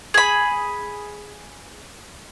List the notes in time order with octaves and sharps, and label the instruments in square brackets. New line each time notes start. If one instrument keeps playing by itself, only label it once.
[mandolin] G#4 B5